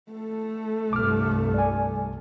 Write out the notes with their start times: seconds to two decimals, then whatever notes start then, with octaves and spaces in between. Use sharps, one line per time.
0.11 A3 A4
0.93 C2 G2 D6 F6
1.54 D5 G#5